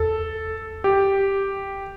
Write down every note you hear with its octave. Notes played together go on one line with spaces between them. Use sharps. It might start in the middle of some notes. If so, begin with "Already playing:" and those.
Already playing: E2 A4
G4